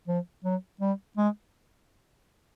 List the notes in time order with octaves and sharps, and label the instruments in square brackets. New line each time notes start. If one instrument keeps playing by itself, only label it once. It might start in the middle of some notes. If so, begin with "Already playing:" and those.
[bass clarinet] F3
F#3
G3
G#3